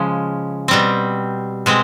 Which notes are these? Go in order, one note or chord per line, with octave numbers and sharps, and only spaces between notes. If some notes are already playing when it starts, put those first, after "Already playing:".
Already playing: C#3 F3 G#3
B2 G3 C4
B2 G#3 C4